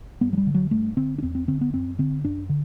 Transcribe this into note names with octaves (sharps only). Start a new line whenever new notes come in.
G2 B3
F#3
G3
D3
F#3
G2 A3
D3 C4
D4
E2 C4
C4
D3 C4
B3
F#2 C4
D3 C4
F#2 D4
D3